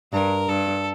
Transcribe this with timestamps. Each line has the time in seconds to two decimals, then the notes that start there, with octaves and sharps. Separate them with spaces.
0.13 G2 A#4
0.48 G2 A4